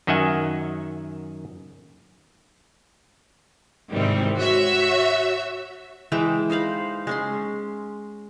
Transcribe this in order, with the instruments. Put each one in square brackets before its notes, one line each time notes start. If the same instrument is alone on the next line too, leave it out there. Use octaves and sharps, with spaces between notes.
[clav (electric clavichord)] F#2 D#3 D#5 E5 F#5 G#5
[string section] G#2 C3 D#3 E3 G3 C4
F#4 C#5 E5 E6
[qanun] E3 G#3 E5 G5
D#4 C5 F5 B5
G#3 C#4 C6